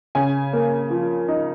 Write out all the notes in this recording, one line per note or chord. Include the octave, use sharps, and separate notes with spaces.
C#3 G#5
A#3
F3
D#4